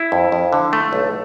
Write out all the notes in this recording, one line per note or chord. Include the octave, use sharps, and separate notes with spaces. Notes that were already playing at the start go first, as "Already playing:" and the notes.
Already playing: E4
F2
F2
D3
A3
B1